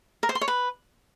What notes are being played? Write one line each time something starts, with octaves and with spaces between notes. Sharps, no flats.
A#4
C5
C6
C#5
B4